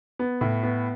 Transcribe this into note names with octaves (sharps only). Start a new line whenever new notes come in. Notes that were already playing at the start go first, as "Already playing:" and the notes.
B3
A2
B3